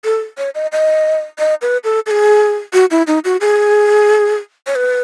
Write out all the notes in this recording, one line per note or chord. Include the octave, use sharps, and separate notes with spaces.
A4
C#5
D#5
D#5
D#5
B4
A4
A4
G#4
F#4
E4
D#4
F#4
G#4
C#5
B4